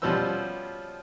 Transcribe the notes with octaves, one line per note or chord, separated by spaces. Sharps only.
B2 F3 G3 C#4 C5 E6